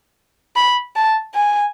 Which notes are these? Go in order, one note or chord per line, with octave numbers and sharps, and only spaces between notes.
B5
A5
G#5